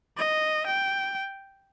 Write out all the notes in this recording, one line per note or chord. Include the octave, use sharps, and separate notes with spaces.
D#5
G5